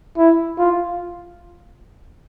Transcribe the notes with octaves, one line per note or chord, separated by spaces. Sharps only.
E4
F4